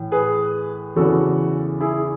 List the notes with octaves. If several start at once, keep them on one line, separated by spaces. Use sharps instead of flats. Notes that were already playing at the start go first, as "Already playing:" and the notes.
Already playing: A2 E3
G#4 B4
E2 C#3 E3 F#4 A4
E4 G#4